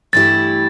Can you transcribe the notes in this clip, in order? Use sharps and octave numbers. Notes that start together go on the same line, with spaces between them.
G2 E3 A3 E4 G4 A6